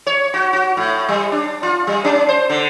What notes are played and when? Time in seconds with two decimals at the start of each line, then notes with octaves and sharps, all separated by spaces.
0.07 C#5
0.34 F#4
0.53 F#4
0.77 A2
1.08 G3
1.32 D4
1.63 F4
1.87 G3
2.05 C#4
2.29 C5
2.50 D3